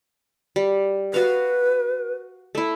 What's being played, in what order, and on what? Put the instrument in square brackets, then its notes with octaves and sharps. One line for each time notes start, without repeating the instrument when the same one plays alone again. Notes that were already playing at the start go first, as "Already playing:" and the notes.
[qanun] G3
[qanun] F#4 F5 [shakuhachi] B4
[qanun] A3 E4